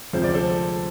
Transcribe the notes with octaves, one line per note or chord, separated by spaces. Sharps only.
D2 C3 F3 G#3 C5
D5
A4 C5